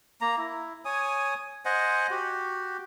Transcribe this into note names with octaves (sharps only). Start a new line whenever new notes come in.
A#3 A#5
E4
C#5 G#5 D#6
C5 D#5 F#5 G#5
F#4 G4